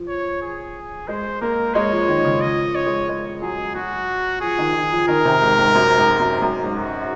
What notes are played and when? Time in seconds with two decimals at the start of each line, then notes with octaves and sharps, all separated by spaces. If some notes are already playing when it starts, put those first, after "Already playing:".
Already playing: F3
0.08 C#5
0.42 G#4
1.08 G#3 C5
1.42 A#3 A#4
1.74 G#3 C#5
1.92 F3
2.09 D#3
2.24 C#3
2.42 F3 D#5
2.75 C#5
2.86 G#3
3.09 G#3
3.42 F#3 G#4
3.75 F#3 F#4
4.41 F3 G#4
4.59 D#3
4.75 F3
4.92 F3
5.08 D#3 A#4
5.25 C3
5.42 G#2
5.58 G#2
5.75 F#2
5.97 G#2
6.20 F#2
6.42 F#2
6.64 G#2
6.76 F#4